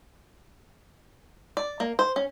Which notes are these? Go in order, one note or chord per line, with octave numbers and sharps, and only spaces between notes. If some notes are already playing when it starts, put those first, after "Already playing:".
D5
A#3
C5
C#4